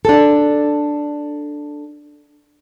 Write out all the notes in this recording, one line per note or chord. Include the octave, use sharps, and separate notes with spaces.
D4 A4